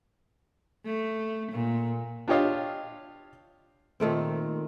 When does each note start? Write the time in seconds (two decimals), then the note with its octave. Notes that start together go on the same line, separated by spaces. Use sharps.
0.85 A3
1.52 A#2
2.28 D4 F4 G4 C#5 D#5 F5
4.00 A#2 D#3 A3 C4